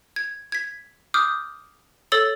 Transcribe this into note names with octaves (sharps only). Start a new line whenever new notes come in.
G#6
G#6 B6
D6 D#6 F6 G6
A4 C#5 E6 A6 F#7 G7